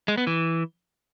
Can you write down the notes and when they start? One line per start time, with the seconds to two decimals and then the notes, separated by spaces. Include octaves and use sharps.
0.08 G#3
0.17 B3
0.27 E3